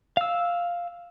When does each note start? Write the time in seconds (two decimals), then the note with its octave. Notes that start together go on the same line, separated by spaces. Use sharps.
0.17 F5 E6